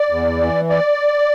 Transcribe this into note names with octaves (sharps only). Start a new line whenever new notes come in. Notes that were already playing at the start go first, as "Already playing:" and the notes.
Already playing: D5
E2
E3
D5